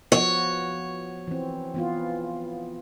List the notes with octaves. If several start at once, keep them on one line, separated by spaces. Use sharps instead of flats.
F3 B3 F#4 C#5
E3 C4
E3 B3 F4